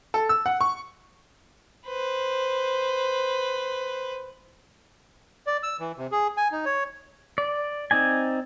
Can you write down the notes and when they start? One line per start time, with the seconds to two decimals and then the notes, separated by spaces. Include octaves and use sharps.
0.14 A4
0.29 E6
0.46 F#5
0.61 C#6
1.87 B4 C5
5.47 D5
5.63 E6
5.80 E3
5.97 C3
6.12 G#4
6.37 G#5
6.52 D#4
6.65 C#5
7.38 D5
7.91 C4 D#4 D5 G#5